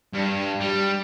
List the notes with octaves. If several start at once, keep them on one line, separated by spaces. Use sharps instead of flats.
G2
G3